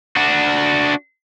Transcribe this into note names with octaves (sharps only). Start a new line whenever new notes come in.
D4 F#4